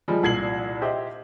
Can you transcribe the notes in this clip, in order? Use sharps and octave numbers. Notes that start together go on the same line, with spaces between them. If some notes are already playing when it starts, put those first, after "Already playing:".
F3 G3 G#3
C2 A#2 G#6 C7 F#7
G4 C5 D#5 E5